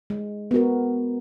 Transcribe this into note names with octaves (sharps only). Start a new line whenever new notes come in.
G#3
B3 F#4 A#4